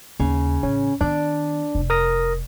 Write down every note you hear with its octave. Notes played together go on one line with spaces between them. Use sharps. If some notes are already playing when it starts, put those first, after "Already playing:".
D#2 C#3
A1 C#4
D#3 B3 D4 D5
F1
A#4 D#6 A#6